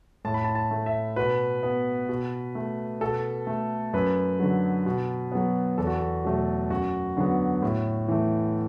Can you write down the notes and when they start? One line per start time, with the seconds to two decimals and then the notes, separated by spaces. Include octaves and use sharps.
0.25 A2 A5
0.34 B5
0.45 A5
0.55 A5
0.71 A3
0.86 E5
1.16 B2 B4
1.63 B3
2.09 B2
2.55 A3
3.01 B2 A4
3.47 A3
3.93 F#2 B4
4.40 D3 F#3
4.86 B2
5.32 F#3 B3
5.78 E2 A4
5.87 F#4
5.96 A4
6.24 B2 F#3 A3
6.70 F#2 F#4
7.17 D3 F#3 B3
7.62 A2
8.08 E3 A3